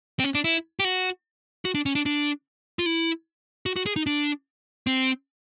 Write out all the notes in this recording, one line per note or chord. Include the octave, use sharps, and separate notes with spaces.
C4
C#4
D4
E4
G4
F#4
F#4
D4
C#4
D4
D4
F4
E4
F#4
F#4
G#4
D#4
D4
C4